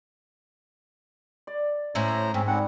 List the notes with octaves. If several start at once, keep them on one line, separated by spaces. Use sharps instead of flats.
D5
A2 C#4 E4 C5 A#5
G#2 C4 C#4
G3 C4 C#4 F#5